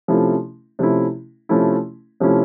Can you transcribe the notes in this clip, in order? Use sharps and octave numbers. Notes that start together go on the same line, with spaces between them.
C3 F3 A3 C#4 E4
C3 F3 A3 C#4 E4
C3 F3 A3 C#4 E4
C3 F3 A3 C#4 E4